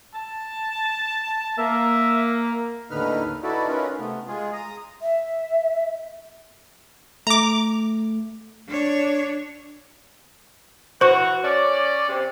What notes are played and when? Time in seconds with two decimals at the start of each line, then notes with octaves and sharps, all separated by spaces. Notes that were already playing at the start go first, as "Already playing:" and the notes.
0.15 A5
1.58 A#3 E5
2.91 D#2 A2 D3 D#4 B4 F6
3.43 D#4 E4 F#4 A4 B4 D5
3.68 C#4 D#4 F4 A#4 B4
3.99 C3 A3 B3
4.27 G#3 F4 G#4
4.53 A#5 D#6
5.02 E5
7.27 A3 A#5 D6
8.68 D4 C#5
11.01 E3 F#4 C5 C#6
11.44 C#4 D5
12.09 C3